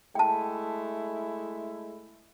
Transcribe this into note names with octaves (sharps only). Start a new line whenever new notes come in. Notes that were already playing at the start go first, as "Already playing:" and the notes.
G#3 A3 E4 G5 A5